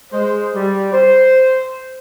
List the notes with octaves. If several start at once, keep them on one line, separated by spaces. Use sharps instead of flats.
G#3 C5
G3
C5